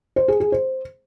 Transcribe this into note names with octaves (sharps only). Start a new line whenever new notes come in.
C5
G#4
G#4
C5